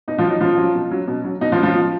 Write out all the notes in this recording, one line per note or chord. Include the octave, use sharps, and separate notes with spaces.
B2 D#4
F3 F4
F#3
D#4
B2 F3 F4
F#3
B2
F#3
B2
F#3
B2 D#4
F3 F4
F#3
F3 F4
B2